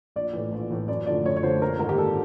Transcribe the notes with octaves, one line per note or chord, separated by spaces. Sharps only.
A#1 D5
A2 E3
A#1
A2 E3
F#2 D5
D3 F3 A3 D5
F#2 C#5
C#5
D3 F3 A3 C5
A#1 A#4
G#2 D#3 A#4
G4
A#1 A4